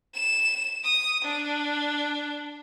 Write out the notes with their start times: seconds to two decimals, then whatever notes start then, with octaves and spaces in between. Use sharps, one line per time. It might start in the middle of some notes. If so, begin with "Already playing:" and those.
0.14 E7
0.84 D#6
1.24 D4